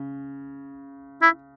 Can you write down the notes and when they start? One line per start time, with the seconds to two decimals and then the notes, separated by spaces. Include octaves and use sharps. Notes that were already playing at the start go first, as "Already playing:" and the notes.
Already playing: C#3
1.22 E4